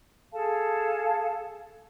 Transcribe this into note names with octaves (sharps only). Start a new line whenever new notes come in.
G#4 A4 F5 A5